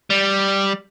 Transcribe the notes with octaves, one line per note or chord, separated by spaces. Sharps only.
G3